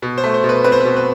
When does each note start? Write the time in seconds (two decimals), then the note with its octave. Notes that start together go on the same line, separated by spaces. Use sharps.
0.02 B2
0.18 C5
0.24 A3
0.34 C5
0.44 B2
0.49 B4
0.64 C4 B4
0.72 C5
0.80 B2 B4
0.96 B4